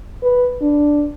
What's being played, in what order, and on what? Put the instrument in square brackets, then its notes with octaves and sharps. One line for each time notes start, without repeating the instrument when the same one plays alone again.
[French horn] B4
D4